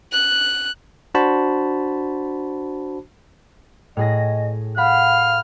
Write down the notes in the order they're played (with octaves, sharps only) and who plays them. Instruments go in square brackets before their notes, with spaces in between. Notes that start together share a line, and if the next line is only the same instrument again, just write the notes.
[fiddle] F#6
[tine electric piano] D4 F#4 C5 A5 B5
[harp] A2 G#4 A#6 [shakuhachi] D#5
[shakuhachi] F5 [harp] F#5 B5 [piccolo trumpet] F6